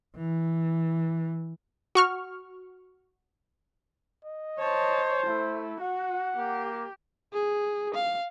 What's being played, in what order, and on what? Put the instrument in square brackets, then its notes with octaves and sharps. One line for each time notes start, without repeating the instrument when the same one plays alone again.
[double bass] E3
[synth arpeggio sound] F#4 C#6 F6
[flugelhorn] D#5
[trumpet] C5 [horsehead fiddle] C#5 A5
[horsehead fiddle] A3 [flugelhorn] E4
[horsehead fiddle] F#4 [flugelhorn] F#5
[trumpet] A#3 [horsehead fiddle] G4
[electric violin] G#4
F5